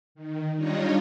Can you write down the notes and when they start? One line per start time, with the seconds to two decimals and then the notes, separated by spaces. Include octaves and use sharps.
0.15 D#3
0.55 G3 D4 D#4 F4 C#5 D#5